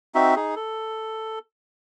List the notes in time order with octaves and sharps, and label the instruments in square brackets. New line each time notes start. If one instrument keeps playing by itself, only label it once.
[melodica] C4 D#4 F#4 E5
D#4 G#4
A4